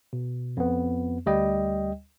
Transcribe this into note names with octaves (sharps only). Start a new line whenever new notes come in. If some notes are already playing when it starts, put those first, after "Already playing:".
B2
F2 B3
D2 G3 D#5 G5